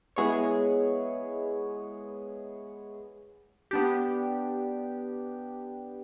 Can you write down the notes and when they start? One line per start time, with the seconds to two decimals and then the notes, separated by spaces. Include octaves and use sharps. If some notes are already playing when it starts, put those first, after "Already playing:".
0.16 G#3 B3 E4 G#4 C#5
3.71 B3 D4 G4